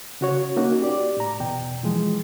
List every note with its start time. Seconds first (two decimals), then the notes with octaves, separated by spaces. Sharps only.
0.21 C#3 F#4 C#5
0.57 A#3 C#4 D#4 F#4
0.82 G4 D5
1.17 A2 A#5
1.40 E2 B2 G5
1.83 E3 F3 G#3